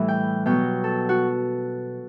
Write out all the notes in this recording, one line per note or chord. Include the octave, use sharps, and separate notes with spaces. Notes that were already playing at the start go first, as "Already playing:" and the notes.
Already playing: A2 E3 G3 E5
G5
B2 F#3 G5
A4
F#4